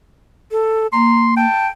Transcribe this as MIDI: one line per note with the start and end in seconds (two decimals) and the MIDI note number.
0.52 0.87 69
0.93 1.45 58
0.93 1.24 82
0.93 1.33 84
1.37 1.69 79
1.37 1.66 81